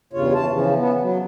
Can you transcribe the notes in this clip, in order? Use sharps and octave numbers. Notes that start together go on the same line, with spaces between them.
E2 G2 C#3 F4 C#5
E3 A5
C#3 E3 F3
B3
F#3